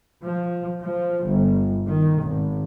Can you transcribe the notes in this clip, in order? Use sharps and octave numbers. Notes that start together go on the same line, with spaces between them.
F3
F3
G1
D#3
G#1